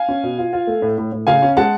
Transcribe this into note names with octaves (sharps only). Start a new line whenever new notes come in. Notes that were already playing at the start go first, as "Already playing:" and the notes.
Already playing: F5 G#5
C#4
B2
F4
F4
A3
A2
A2
A2
C#3 F5 G#5
C#4
G#3 F#5 A5